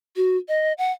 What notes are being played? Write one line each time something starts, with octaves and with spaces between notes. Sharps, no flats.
F#4
D#5
F#5